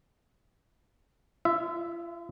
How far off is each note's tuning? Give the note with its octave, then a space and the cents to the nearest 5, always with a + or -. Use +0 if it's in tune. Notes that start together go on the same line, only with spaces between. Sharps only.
F4 -40 E5 +5